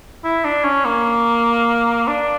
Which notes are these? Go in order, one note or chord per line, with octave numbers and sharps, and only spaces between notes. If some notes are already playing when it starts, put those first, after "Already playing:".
E4
D4
C#4
A#3
D4